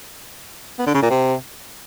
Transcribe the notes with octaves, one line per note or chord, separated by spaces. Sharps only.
B3
D3
C#3
A#2
C3